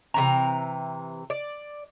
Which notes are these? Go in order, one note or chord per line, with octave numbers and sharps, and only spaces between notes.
C3 E3 A#5
D5